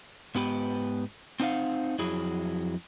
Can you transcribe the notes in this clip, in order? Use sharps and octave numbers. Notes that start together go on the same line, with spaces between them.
G#2 B3 G4 B4
C4 D#4 C5 D5 F5 F#5
F2 F#3 E4 G#4